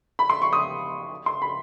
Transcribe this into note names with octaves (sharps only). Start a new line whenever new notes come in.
B5
C6
C#6
D#6
C6
B5